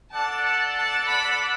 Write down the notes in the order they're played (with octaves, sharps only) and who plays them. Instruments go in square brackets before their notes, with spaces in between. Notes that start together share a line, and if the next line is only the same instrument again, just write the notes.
[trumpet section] D4 A4 D5 F#5 [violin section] A5
[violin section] A5
A5
B5